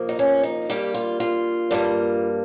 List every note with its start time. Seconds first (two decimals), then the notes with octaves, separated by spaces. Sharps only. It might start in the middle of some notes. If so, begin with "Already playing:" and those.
Already playing: F2 C3 F3 A#3
0.09 D#4
0.19 C#4
0.43 D#4
0.69 G2 G3 A#3 G4
0.94 F4
1.20 F4
1.71 G2 G3 A#3